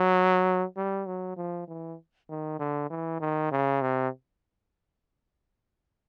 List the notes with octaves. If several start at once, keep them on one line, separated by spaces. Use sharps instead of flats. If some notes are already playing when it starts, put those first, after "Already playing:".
Already playing: F#3
G3
F#3
F3
E3
D#3
D3
E3
D#3
C#3
C3